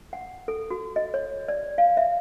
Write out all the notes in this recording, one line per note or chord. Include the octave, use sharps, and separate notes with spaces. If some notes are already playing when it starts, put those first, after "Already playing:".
F#5
A4
F#4
D#5
C#5
D5
F5
E5